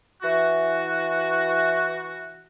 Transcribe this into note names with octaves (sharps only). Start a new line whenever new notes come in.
E3 F#4